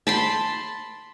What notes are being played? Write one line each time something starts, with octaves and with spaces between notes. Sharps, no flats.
A5 B5 C6